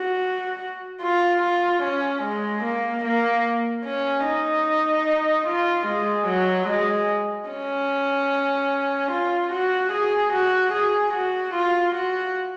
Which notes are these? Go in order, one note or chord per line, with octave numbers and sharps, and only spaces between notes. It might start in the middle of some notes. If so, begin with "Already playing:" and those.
Already playing: F#4
F4
F4
C#4
G#3
A#3
A#3
C#4
D#4
F4
G#3
F#3
G#3
C#4
F4
F#4
G#4
F#4
G#4
F#4
F4
F#4